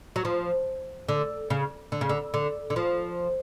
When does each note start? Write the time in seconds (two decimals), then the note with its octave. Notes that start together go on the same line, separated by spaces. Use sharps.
0.16 F#3
0.25 F3
1.08 D3
1.50 C#3
1.92 D3
2.01 C#3
2.09 D3
2.34 D3
2.70 D3
2.76 F3